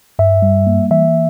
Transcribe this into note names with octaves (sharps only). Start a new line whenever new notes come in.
G2 E5
G3
A#3
E3 E5